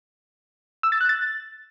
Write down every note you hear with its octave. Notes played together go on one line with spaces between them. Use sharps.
E6
A6
F#6
A6